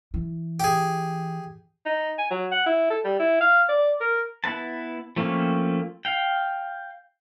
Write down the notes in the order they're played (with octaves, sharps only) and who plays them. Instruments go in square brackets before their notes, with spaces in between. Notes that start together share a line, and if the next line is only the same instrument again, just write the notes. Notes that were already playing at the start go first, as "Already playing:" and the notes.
[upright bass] E3
[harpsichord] G4 G#4
[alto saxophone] D#4
G#5
F#3
F#5
E4
A4
G3
E4
F5
D5
A#4
[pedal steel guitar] B3 E4 B4 A5
F3 A3 A#3 C4 C#4
F5 G5